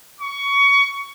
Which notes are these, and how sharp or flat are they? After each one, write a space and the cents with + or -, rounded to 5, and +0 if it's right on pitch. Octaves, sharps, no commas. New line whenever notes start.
C#6 +20